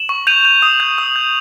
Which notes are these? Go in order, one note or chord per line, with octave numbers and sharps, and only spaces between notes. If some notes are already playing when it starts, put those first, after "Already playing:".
Already playing: E7 F#7
C#6
G6 D#7 F7
G6
D#6
G6
D#6
G6